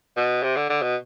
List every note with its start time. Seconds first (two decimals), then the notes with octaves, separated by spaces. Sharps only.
0.17 B2
0.43 C3
0.56 D3
0.70 D3
0.82 B2